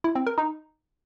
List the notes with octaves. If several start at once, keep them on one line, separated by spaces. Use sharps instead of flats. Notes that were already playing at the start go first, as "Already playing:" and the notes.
E4
C4
A#4
D#4